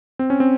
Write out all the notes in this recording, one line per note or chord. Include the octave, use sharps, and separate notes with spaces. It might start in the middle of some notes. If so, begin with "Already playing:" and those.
C4
C#4
C4